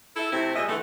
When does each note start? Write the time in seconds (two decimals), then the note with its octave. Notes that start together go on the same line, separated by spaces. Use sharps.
0.16 E4 A4
0.32 C3 A3 C4 E4
0.56 A#2 G3 G#3 D#5 E5
0.68 D3 E3 A3